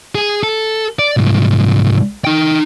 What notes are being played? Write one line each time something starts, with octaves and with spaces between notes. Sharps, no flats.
G#4
A4
D5
C2 G#2
D#4 G5